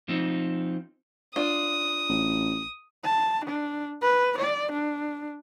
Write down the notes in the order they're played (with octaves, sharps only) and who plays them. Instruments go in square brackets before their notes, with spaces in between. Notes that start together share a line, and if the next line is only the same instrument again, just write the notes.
[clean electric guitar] F3 C4 D#4
[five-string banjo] D4 F4 [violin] D#6
[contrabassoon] A1
[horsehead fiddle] A5
D4
B4
D5
D4